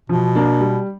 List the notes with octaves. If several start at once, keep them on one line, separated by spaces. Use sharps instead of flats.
B2 F3
A#3 D4
G3